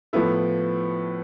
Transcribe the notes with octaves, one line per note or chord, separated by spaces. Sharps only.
A2 F3 B3 E4 A4